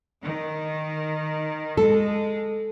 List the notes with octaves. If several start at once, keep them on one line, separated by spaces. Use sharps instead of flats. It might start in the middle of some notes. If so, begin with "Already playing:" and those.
D#3
G#3 A4